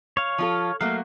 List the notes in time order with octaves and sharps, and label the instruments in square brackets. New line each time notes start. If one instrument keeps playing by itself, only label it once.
[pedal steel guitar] C#5 F5
[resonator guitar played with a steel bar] F3 F4 A4
[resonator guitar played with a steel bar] F#3 A3 A#3 [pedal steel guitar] F5